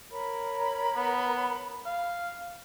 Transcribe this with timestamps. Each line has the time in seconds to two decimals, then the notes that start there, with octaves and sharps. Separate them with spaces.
0.11 A#4 C#5 B5
0.96 B3
1.86 F5